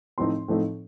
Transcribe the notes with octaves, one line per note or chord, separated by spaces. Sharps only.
A2 F3 A3 C4 D#4 C6
A2 F3 A3 C4 D#4